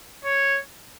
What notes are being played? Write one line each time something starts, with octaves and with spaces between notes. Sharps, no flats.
C#5